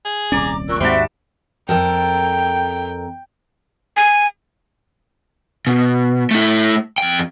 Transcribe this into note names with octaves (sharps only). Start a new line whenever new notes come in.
G#4
D#1 C2 C#4 D5 A#5 D6
A#2 C#6 E6 F#6
D#2 G#2 G3 G#3 C4 F#4 E5 A5
F2 A4 A#4 G5
G#5
B2
A3 E4
F2 G5